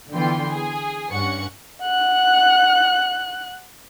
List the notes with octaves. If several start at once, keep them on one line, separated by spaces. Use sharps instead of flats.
D3 E3 B3 F4 G5 C6
G#4
G2 C#4 F#5 C#6 C#7
F#5 F#6